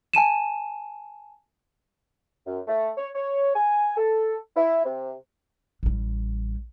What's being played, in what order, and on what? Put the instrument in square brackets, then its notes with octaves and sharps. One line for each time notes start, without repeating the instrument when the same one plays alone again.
[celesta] G#5 A5 D#7 E7
[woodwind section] F#2
A3
C#5
C#5
G#5
A4
E4
C3
[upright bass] A1 G3